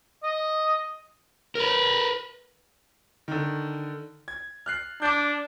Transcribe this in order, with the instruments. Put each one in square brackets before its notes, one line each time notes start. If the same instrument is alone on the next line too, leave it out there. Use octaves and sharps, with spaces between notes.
[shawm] D#5
[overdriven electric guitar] A#4 B4
[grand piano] D3 D#3
G#6
F6 F#6 C7
[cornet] D4 [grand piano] D6 G6